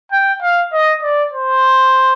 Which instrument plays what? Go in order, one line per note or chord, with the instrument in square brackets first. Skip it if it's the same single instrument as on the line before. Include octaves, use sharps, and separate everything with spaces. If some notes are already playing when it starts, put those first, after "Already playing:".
[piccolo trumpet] G5
F5
D#5
D5
C5